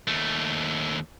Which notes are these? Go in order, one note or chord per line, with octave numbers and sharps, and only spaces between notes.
D#2 A3